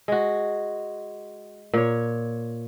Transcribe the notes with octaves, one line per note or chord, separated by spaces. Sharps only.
G#3 F#4
A#2 C#5